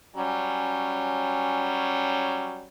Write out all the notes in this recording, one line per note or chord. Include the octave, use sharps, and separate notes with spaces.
F#3 G3 C#4